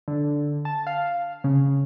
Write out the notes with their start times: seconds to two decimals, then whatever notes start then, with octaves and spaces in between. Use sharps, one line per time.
0.08 D3
0.65 A5
0.87 F5
1.44 C#3